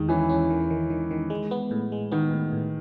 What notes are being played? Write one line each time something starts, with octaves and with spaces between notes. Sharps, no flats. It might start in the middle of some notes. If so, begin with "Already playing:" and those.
Already playing: E2 D#3 G#3
E3 C#4
C#4
D#3
D#3
D#3
D#3
G#3
B3
A2
G#3
D#3 B3
A2
A2